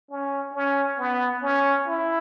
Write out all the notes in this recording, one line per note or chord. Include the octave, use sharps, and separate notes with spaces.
C#4
C#4
B3
C#4
E4